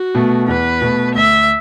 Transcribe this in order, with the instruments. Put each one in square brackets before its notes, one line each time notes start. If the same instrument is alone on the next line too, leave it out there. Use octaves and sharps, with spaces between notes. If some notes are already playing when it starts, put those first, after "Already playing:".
Already playing: [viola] F#4
[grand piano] B2 A3
[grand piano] E2 [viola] B4
[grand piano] B2 A3
[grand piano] D2 [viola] E5